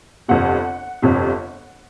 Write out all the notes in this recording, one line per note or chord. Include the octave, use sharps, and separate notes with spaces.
G1 F2 C3 F#5
G1 F2 C3